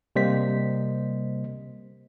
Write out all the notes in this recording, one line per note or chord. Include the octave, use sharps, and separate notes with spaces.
C3 G3 A#3 C5 D#5 B6